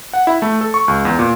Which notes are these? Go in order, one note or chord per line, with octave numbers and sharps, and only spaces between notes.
F#5
E4
A3
A4
C#6
C#2
E2
A#2